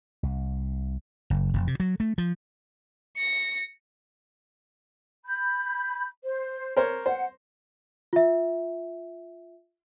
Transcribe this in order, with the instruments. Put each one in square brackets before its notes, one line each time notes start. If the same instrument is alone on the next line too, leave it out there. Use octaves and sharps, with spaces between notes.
[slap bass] C2
F#1
F1
C3
F#3
A3
F3
[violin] A#6 C#7
[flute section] B5 G6
C5
[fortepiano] A#4 C5 C#5
[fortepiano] C5 [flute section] F#5
[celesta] F4 E5